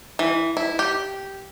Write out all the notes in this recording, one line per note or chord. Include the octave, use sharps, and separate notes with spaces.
E3
E4
G4